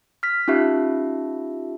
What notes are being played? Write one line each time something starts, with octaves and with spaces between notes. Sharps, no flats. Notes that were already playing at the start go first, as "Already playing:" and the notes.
F6 B6
C#4 D#4 F4 G4 E5